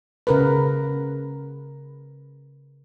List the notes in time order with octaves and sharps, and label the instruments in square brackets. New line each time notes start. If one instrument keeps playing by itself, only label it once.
[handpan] C#3 A#4 B4